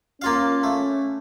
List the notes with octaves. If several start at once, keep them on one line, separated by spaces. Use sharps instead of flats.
A#3 C#4 F4 F5
A3